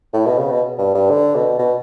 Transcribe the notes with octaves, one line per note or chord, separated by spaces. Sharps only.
A2
B2
C#3
B2
G2
G2
D3
B2
B2